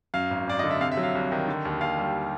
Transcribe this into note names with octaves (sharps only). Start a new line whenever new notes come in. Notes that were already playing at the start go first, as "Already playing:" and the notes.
F#2 F5
G#1
G#1 D5
D3 D#5
E5
C3 F5
E5
F#3
F5
C2
D#3
D3
D#2
D#2 F5
G3